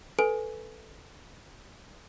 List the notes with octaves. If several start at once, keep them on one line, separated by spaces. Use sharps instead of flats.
A4 B4 G#5 D7